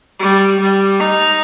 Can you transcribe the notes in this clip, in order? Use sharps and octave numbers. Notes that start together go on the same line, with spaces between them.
G3
G3
D#4